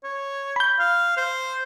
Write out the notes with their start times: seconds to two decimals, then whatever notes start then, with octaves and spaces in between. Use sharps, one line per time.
0.04 C#5
0.56 B5 G6
0.79 F5
1.17 C5